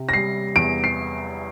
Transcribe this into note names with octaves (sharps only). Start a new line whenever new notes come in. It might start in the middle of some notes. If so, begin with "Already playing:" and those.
Already playing: C3
A#6
G3 C7
E2 D7
C7